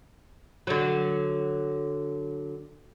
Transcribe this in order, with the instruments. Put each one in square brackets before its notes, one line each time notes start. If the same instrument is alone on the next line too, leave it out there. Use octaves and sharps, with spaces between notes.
[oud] D3 F#3